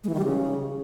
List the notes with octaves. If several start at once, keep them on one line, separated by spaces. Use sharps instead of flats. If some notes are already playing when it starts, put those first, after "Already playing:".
G#3
E3
D#3
G3
C#3